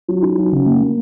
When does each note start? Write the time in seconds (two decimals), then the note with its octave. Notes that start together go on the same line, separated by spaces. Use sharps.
0.08 F#3
0.22 D#4
0.38 F#3
0.52 C#3
0.66 A#3
0.81 A#3